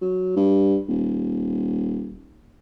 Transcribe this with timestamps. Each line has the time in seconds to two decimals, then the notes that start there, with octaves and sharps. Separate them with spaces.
0.01 F#3
0.37 G2
0.88 D#1